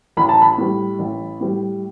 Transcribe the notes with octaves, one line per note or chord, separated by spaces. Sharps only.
A1 B5
A5
B5
A2 G3
A1
A2 G3